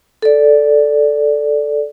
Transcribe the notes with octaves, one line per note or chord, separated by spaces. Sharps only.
A4 D5